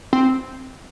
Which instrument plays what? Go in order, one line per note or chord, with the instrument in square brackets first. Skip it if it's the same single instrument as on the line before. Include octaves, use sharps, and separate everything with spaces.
[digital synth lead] C4